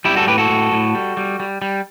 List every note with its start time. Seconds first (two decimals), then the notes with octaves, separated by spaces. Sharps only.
0.05 G3 E4 G4
0.16 F#4 A4
0.27 A2 G4 B4
0.38 F#4 A4
0.50 A2
0.72 A2
0.95 G3
1.17 G3
1.40 G3
1.62 G3